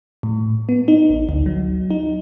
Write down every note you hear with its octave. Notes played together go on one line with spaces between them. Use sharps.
A2
B3
D#4
A1
D2
F#3
D#4